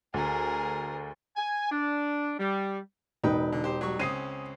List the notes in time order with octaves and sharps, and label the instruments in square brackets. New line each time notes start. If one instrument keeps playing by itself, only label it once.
[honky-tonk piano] D2 [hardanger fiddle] G#4 A#4
[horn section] G#5
D4
G3
[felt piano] E1 D#4 [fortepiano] B4 G5
[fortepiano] D3
G4 C5
F#3 G3 C#6
[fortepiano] C#2 C4 C#4 [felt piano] D#6 C7 D#7